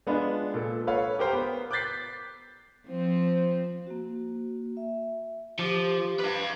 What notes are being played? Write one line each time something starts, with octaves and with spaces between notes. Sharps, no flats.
G#3 B3 D4 F4
A#2 A4
A4 B4 C#5 F5
G4 A#4 C5 G5
B3
D6 F#6 G6 A6 B6 C7
F3 C4
A#3 F#4
E5
F3 G4 D6
B4 F5